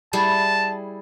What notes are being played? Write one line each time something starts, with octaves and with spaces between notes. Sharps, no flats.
G3 E4 G#4 A5